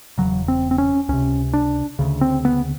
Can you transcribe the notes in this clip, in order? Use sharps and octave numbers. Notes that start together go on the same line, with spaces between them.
E1 E2 C#3 F#3
C4
C4
C#4
C#2 C3 C#4
D4
D2 C#3
C4
B3